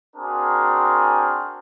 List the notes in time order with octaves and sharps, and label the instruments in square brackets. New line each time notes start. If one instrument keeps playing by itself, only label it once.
[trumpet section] C4 D4 F#4 G#4 A#4